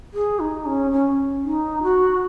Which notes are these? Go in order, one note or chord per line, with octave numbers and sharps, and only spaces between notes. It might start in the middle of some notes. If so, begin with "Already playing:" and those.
G#4
D#4
C#4
C#4
D#4
F#4